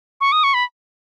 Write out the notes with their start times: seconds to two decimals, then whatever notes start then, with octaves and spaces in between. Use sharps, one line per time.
0.21 C#6
0.32 D#6
0.44 C#6
0.54 B5